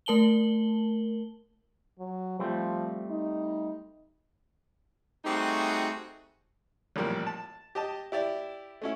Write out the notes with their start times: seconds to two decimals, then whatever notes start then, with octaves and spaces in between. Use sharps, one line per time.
0.06 A3 A#4 A5 F#7 G7
1.99 F#3
2.39 F3 G3 A3 C4
3.10 D#4
5.25 G3 A3 C4 D#4 F#4 G#4
6.96 A1 F2 A#2 G3 A#4
7.27 A5
7.75 G4 D#5 A5
8.12 E4 G4 D5 E5
8.82 A3 C#4 E4